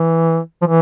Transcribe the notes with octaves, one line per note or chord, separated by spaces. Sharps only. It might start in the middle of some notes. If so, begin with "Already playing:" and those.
Already playing: E3
F3
E3